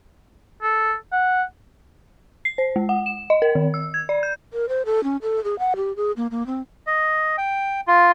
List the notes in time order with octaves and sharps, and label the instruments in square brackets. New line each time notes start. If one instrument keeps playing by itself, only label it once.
[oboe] A4
F#5
[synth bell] C7
C5
G#3
F#5
E7
D#5
A#4
D#3
E6
G#6
D5
G6
[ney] A#4
C5
A4
C#4
A4
G#4
F#5
G4
G#4
A#3
A#3
C4
[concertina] D#5
G5
F4